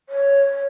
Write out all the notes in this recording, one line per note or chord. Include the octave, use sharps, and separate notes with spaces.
C#5